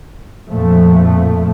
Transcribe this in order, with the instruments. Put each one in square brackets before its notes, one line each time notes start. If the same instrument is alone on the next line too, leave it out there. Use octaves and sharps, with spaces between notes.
[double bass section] F2 A#2 F3 A3